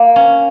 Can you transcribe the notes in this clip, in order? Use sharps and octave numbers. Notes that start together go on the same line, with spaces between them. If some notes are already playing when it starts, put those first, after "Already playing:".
Already playing: A#3
C#4